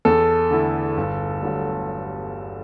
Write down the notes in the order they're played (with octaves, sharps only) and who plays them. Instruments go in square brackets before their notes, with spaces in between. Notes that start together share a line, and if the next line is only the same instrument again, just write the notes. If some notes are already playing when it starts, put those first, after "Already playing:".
[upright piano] E2 [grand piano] A4
[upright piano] D3 A3 E4
G1
G2 D3 F#3 A3